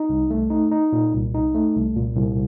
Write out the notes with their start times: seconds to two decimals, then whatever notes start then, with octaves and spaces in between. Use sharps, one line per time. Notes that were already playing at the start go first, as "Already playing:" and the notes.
Already playing: D#4
0.09 C2
0.30 A3
0.50 D#4
0.71 D#4
0.92 A#2
1.13 C2
1.34 D#4
1.55 A3
1.75 C2
1.96 A#2
2.16 C2